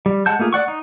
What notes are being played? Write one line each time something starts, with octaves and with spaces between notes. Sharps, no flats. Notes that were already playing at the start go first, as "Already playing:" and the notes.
G3
G#3 F#5 A5 G6
A3 A#3 F4 G#4
D5 F#5 C#6
D#4